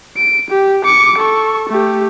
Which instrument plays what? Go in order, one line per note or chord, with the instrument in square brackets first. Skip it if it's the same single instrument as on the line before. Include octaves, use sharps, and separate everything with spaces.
[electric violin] D7
G4
D6 C#7
A4 C#6
A3 G4